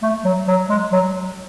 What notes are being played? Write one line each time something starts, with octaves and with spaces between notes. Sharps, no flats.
A3
F#3
F#3
G#3
F#3